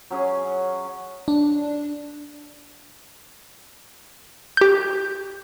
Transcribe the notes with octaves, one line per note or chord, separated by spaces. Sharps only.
F#3 C#4 G#4
D4
G4 G6